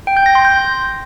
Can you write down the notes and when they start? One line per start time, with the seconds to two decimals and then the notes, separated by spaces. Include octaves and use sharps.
0.07 G5
0.17 G6
0.26 A#6
0.35 C6
0.45 G6